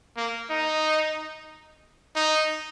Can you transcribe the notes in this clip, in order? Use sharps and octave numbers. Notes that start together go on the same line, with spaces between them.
A#3
D#4
D#4